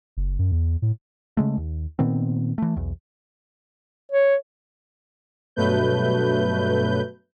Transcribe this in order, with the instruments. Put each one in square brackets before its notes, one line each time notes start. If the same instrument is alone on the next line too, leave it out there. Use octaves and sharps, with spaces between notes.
[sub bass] F#1
F#2
E2
A2
[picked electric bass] C#3 G#3 A3
D#2
A#2 D#3 B3 C4
E3 A3
B1 E2
[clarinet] C#5
[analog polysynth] G2 B2 F#3 A3 B4 G6